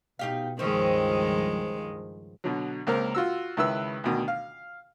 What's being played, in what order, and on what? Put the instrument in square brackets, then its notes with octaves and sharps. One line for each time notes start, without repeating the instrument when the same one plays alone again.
[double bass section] B2 [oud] D#4 G4 F5
[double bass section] C#2 G2 F3 [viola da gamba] D#3 G#3 [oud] C4 C#4
[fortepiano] B2 D3 F#3
C#2 A#3 C4 A#4
F4 F#4 E6
C#2 D#3 E4 B4 E6
D2 B2 D#3
F5